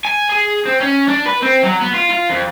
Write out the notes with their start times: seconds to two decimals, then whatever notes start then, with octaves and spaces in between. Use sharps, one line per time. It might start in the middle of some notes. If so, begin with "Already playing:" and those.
0.05 G#5
0.29 G#4
0.66 C4
0.81 C#4
1.08 D4
1.26 B4
1.42 C4
1.63 F#3
1.81 B3
1.94 F4
2.11 F4
2.30 F2